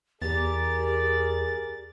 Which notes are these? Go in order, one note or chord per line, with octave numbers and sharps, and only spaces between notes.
E2 G4 G#4 A#4 D5 A6